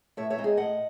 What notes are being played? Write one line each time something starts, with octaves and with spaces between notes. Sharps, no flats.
A2 C#5 E5
C#5 E5
G#3 C4 D#4
G#4
A2 D#5 F#5